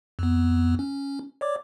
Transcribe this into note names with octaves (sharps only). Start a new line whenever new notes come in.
F2 B3
C#4
C#5 D5 D6